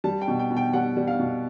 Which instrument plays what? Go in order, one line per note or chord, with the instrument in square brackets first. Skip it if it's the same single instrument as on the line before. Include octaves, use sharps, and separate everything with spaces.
[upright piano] G3 A5
G5
B2
G5
B2
G5
G3 F#5
G3
F5
B2